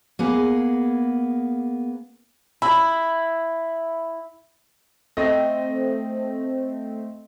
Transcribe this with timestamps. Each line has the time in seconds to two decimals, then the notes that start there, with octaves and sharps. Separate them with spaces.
0.19 A#3 B3 G#4
2.62 E4 B5
5.17 A3 C4 D#5